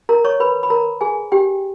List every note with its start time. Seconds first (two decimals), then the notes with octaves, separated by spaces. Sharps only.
0.09 A#4 A#5
0.24 C#5 C#6
0.40 B4 B5
0.63 B5
0.70 A#4 A#5
1.01 G#4 G#5
1.32 G4 G5